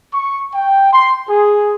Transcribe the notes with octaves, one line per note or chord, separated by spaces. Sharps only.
C#6
G5
C6
G#4